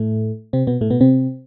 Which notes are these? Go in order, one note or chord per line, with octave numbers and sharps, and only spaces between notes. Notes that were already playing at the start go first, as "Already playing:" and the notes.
Already playing: A2 A3
C3 C4
B2 B3
A2 A3
B2 B3
C3 C4